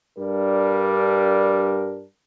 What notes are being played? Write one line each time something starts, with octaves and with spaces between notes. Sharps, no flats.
G2 G3 D4 A#4